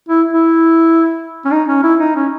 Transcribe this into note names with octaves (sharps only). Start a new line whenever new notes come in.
E4
E4
C#4
D#4
C#4
E4
D#4
C#4